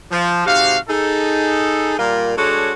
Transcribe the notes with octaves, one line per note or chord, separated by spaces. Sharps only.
F3
G#2 C3 F#4 G4 F5
D#4 G#4 A4
A#2 G3 F4 A#4
G#3 D4 F#4 A4 C#5